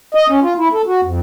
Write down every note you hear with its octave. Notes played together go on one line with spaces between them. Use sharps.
D#5
C#4
F4
E4
A4
F#4
F2